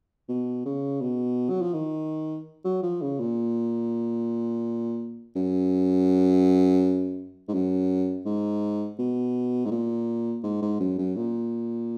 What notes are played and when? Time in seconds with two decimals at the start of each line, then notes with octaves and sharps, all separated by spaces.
0.29 B2
0.65 C#3
1.01 B2
1.49 F#3
1.62 F3
1.74 D#3
2.65 F#3
2.83 F3
3.01 C#3
3.20 A#2
5.36 F#2
7.48 G#2
7.54 F#2
8.25 G#2
8.99 B2
9.65 G#2
9.71 A#2
10.43 G#2
10.62 G#2
10.79 F#2
10.98 F#2
11.16 A#2